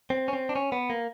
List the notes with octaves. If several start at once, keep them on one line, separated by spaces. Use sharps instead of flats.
C4
C#4
C4
D4
C#4
B3
A#3